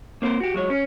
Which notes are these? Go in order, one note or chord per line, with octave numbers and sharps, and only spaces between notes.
A#3 C4 A#4 C5
F#4 G4
F#3 G#3 C#5
C#4